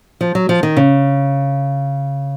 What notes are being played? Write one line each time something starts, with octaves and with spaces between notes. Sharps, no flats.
F3
F#3
F3
D#3
C#3